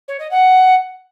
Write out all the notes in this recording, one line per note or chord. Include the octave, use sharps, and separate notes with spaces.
C#5
D#5
F#5